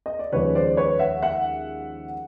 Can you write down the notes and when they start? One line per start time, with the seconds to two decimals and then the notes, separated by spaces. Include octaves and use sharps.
0.06 D#5
0.19 D5
0.32 D#2 C#3 F3 G#3 B4 C#5
0.55 C5 D5
0.77 B4 C#5
0.99 E5 F#5
1.23 E5 F#5